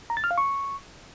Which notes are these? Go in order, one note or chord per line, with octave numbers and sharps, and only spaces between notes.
A#5
A6
F6
F5
C#6